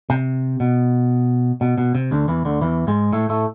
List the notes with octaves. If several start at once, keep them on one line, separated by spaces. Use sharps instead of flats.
C3
B2
B2
B2
C3
D2 D3
E2 E3
D2 D3
E2 E3
G#2 G#3
A2 A3
A2 A3